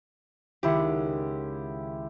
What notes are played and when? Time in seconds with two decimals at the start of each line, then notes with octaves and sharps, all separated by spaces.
0.63 C#2 D#3 E4 G4 F#5